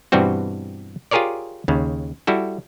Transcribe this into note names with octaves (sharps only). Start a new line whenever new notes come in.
G2 B2 E3 G3 C4 F#4
F4 G4 G#4 A#4 C#5 D5
D#2 C#3
G3 E4 F#4 A4